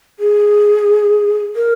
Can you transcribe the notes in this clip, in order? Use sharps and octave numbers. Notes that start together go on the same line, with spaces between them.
G#4
A#4